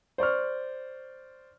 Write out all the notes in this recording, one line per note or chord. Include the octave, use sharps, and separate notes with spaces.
C5 D5 C#6 F6